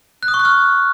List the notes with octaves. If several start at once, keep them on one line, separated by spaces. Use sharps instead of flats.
F#6
D#6
C#6
F#6
F6